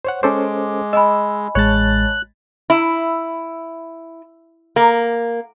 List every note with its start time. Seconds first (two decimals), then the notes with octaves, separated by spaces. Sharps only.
0.05 C5 C#5 F#5
0.23 G#3 C#4 A4 C5 D6
0.93 D#5 G#5 B5 E6
1.55 A1 G#3 C#5 A5 F#6 A6
2.70 E4
4.76 A#3